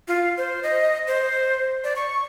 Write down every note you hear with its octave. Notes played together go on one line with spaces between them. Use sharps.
F4
C5
D#5
C5
D5
C#6